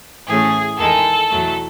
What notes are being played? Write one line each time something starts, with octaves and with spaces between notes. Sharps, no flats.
A2 E3 A3 C#4 G#4
E2 D#3 G#3 A4
E2 B2 F#3 A3